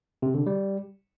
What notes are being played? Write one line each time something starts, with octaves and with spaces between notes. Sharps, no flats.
C3
D3
G3